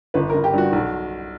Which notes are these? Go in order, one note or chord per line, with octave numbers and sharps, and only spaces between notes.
G1 B4
G1 A#4
G4
G2 F#4
B1 F#4